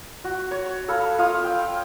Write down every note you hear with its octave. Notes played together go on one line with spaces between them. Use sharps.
F#4
C#5
A4 F5 B5
F4 F5 D#6
G5